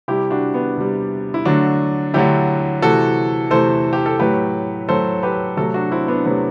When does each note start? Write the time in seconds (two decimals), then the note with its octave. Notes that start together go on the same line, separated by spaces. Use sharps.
0.08 C3 G3 E4 G4
0.31 D4 F#4
0.54 B3 D4
0.77 C3 G3
1.34 E4
1.45 D3 F#3 A3 D4 F#4
2.14 D3 F#3 A3 E4 G4
2.82 C3 E3 A3 F#4 A4
3.51 C3 E3 A3 A4 C5
3.93 G4
4.06 A4
4.20 A2 F#3 A3 G4 B4
4.88 A2 F#3 A3 A4 C5
5.23 G4 B4
5.57 C3 F#3 A3 F#4 A4
5.74 D4 F#4
5.91 C4 E4
6.08 B3 D4
6.25 C3 F#3 A3 B3